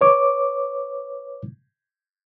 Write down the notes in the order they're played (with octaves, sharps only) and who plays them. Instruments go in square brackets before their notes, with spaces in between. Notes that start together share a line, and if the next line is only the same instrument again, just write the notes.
[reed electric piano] B4 C#5 D6